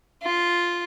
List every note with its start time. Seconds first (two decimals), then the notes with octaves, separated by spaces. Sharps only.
0.23 F4